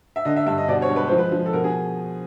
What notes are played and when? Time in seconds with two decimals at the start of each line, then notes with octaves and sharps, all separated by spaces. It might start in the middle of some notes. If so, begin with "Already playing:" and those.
0.16 E5
0.25 D3 D#5
0.36 E5
0.46 G2 E5
0.58 D#5
0.68 B2 D5
0.82 C#5
0.89 G#3
0.96 B4
1.07 F3 C5
1.18 B4
1.32 F3
1.46 A4
1.53 B2 A#4
1.64 G#4